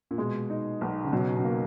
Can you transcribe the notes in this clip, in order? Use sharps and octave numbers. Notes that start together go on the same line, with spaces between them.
A#2
B2 G#3
D#4
B1
C#3
B2 F#3
B2
A#3